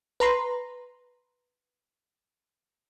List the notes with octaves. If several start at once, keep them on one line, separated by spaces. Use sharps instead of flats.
B4 A#5 C6